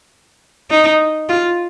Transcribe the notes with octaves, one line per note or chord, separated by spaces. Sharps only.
D#4
F4